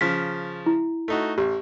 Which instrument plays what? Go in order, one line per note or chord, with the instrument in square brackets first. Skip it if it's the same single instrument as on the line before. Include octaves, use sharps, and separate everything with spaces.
[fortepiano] C#3 F3 [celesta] B6
[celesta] E4
[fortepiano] A3 D#4 F#4
[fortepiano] A1 [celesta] G4